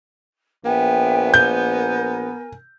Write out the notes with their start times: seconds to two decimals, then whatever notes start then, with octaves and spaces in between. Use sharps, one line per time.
0.65 A#1 B3 E5 G5 G#5
1.34 A#4 G#5 G6